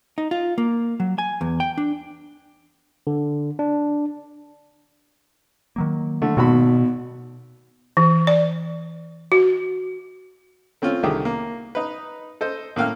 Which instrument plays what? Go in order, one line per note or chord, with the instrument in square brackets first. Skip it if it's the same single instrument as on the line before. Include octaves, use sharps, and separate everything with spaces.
[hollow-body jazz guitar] D#4
F4
A#3
F#3
G#5
E2
G5
D4
[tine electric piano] D3
D4
[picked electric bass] D#3 F#3 A#3
[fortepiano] D3 A3
[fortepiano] G#1 F#4 B5 [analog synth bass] B2 [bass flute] B3
[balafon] E3
D5
F#4
[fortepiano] A3 C4 C#4 F4 C#5
C2 D3 D#3 G4 G#4
A#3
D#4 B4
A4 C5 D#5
A2 A#3 F5 G5 F6